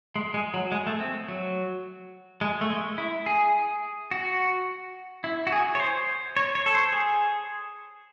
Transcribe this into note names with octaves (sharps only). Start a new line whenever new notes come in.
G#3
G#3
F#3
G#3
A3
C4
F#3
G#3
A3
G#3
E4
G#4
F#4
E4
F#4
G#4
C#5
C5
C#5
C#5
A4
C5
G#4